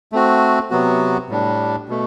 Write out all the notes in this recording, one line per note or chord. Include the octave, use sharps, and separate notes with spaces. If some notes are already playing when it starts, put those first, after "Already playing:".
A3 C4 F#4
C3 F#3 B3 F#4
A2 G3 D4
B2 A3